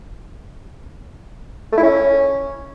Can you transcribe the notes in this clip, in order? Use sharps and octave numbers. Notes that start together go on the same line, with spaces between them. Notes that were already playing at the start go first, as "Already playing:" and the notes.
A3
E4
C#4